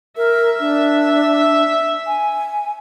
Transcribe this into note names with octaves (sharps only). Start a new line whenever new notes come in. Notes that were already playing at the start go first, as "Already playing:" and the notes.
A#4 E5
D4
G#5